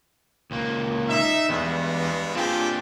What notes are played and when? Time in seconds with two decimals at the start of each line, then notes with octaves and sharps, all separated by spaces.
0.51 C#2 A#3
1.09 D#4 E5
1.50 E2 G2 G#3 B3
2.35 C4 D4 F4 G4 G#4